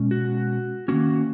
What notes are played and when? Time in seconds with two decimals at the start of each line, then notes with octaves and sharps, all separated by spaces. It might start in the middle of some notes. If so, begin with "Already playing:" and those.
Already playing: B2 G#3 C#4
0.11 F#4
0.88 D#3 A#3 C#4 F#4